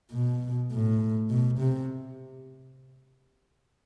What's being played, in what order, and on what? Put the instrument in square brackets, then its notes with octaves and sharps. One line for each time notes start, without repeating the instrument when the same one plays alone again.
[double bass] B2
A2
B2
C3